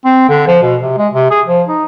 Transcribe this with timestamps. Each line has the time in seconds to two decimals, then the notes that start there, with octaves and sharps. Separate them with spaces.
0.05 C4
0.29 D3
0.47 F3
0.62 B2
0.82 C3
0.98 G#3
1.14 C3
1.30 G#4
1.46 F3
1.69 D#4